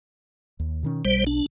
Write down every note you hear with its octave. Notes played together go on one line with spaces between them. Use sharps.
D#2
B2 D#3 C#4
B1 G3 C5
D4